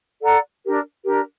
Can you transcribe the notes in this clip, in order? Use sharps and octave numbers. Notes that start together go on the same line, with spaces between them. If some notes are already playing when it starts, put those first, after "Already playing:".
A4 D5 F#5 A#5
D4 G4 A#4
D4 G4 A#4